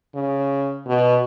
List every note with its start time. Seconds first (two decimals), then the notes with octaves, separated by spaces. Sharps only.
0.15 C#3
0.87 B2